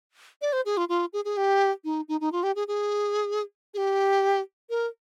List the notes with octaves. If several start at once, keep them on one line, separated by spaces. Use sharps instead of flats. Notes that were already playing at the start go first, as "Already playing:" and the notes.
D5
C5
G#4
F4
F4
G#4
G#4
G4
D#4
D#4
D#4
F4
G4
G#4
G#4
G#4
G4
A#4